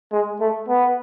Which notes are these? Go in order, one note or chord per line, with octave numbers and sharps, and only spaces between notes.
G#3
A3
B3